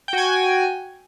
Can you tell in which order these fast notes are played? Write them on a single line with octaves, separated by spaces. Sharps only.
G5 F#4 G#5